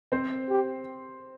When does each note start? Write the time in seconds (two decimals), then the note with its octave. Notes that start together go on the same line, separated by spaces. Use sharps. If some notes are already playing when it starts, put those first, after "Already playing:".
0.12 C4 C5
0.49 G4